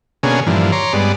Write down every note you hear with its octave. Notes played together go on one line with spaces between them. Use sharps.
B2 D3 A#3 C#4 G#4
G2 A#2 D3 E3 F3
C#5 A#5 C6 D6
G2 G#3 B3 D5